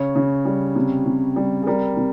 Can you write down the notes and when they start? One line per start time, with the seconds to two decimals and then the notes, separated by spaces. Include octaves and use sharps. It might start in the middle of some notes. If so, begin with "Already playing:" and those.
Already playing: C#3 C#5
0.16 C#3
0.45 G3
0.76 C3
1.06 C3
1.36 G3
1.63 G#4
1.67 G3 A#4
1.97 C3